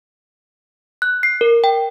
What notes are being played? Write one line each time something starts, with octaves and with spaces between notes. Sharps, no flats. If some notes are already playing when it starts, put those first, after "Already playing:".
F#6
C7
A#4
G5